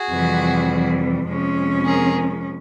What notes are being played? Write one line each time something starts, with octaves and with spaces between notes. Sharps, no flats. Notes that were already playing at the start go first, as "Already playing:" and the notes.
Already playing: F#4 G#4
F2 C3 E3 G3
F2 C3 F3 G#3 C#4
G#4 A#4